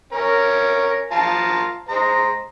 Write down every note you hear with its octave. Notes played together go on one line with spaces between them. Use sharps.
C#4 A#4
F4 A5 A#5
G#3 C5 A#5